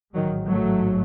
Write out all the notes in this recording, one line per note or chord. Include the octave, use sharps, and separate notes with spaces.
A1 G#2 D#3 F#3
F#3 A3